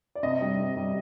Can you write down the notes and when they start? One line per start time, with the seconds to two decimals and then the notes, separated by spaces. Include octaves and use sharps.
0.15 D5
0.23 C3 D#5
0.41 G3
0.58 C3
0.77 G3